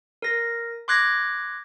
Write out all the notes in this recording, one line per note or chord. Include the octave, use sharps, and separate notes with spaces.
A#4 A#6
C6 D6 F#6 G#6 A#6